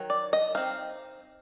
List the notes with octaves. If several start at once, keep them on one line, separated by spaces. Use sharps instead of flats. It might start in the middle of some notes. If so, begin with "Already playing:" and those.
Already playing: D#3 F#3
D5
D#5
C4 D#4 F5